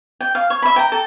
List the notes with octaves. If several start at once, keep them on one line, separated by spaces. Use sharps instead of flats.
G5
F5
C#5
E5 B5
G5 A#5
A4